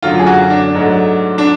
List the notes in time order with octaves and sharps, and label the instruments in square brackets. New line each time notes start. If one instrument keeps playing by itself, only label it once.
[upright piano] F#2 D3 F#3 A3 F4
G#4
F#4
D4
G#2 F#3 A3
D4